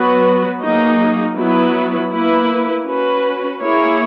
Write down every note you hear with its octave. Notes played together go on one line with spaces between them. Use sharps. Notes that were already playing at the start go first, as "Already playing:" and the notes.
Already playing: F#3 B3 F#4 B4
F#3 A#3 D#4 G#4
F#3 B3 E4 B4
A#3 E4 B4
C#4 F#4 B4
A#3 E4 G#4 C#5